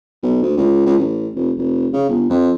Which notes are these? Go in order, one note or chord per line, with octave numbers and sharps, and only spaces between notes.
B1
D2
C#2
C#2
A1
F1
F1
C#3
G1
F2